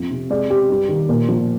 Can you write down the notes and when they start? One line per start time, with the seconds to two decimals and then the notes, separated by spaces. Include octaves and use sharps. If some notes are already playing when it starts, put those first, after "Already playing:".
Already playing: F2 F3
0.11 C3
0.30 G#3 D5
0.50 G#3 G4
0.69 G2
0.89 D#3
1.09 A#2
1.29 F3